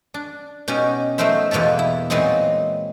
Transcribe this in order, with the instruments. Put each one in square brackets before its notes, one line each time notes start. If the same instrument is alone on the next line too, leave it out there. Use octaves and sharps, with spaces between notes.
[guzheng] D4
B2 C#4 D#4 G4
F#3 A3 D#4 A#4 C5 E5
E2 B2 A#3 G4 A4
E4
A#2 E3 F#3 G#3 C4 D#4